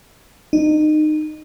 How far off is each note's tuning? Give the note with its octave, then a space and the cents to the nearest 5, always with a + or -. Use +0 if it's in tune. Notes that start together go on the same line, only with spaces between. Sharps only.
D#4 -25